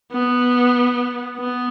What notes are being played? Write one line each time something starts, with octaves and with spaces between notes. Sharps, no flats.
B3
B3